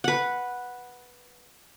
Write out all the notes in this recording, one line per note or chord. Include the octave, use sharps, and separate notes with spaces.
B4 F#5